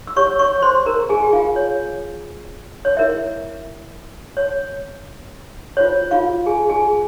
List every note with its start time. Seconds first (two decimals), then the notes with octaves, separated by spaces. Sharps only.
0.07 E6
0.16 G4 C#5 C#6
0.39 C#5 C#6
0.62 C5 C6
0.86 A#4 A#5
1.09 G#4 G#5
1.23 G5
1.33 F4 F5
1.56 C#5
2.85 C#5
2.97 E4 A#4 C#5 E5
4.37 C#5
5.77 F4 C5 C#5
6.11 F4 F5
6.46 G#4 G#5
6.70 G#4 G#5